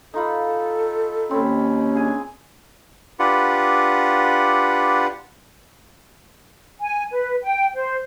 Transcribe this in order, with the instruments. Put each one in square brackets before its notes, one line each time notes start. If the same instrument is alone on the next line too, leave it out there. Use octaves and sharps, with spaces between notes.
[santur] D#4 F4 B5 [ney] A4
[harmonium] D#2 [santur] C4 B5 [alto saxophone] C#4
[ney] D4 [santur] G#4 G#5
[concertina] D4 F4 G4 B4 F#5
[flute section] G#5
B4
G5
C5